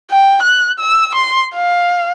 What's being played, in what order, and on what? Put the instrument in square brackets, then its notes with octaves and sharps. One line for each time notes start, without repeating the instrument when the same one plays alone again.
[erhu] G5
F#6
E6
C6
F5